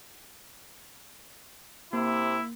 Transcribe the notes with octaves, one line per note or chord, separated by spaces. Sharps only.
C3 A#3 E4